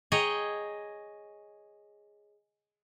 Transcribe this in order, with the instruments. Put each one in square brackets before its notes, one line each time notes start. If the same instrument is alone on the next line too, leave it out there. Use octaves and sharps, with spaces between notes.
[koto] G#4 C#5 D#5 G5 A#5